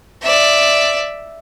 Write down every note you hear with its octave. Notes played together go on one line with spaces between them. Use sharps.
D5 E5